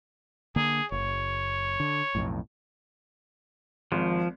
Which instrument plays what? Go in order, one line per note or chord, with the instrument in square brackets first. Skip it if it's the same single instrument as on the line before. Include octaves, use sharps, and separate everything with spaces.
[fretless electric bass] D3 A#3 [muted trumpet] G#4
[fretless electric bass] F#1 [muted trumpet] C#5
[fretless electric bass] D3
B1 F2 A2
[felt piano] G#1 [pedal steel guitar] F3